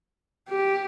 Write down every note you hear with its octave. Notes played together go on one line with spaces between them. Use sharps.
G4